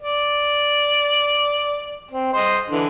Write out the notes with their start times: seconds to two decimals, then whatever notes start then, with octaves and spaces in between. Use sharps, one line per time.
0.01 D5
2.11 C4
2.33 C5 D#5
2.70 D3 E3